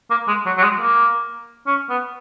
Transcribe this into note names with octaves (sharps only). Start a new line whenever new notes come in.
A#3
G#3
F#3
F#3
G#3
A#3
C#4
B3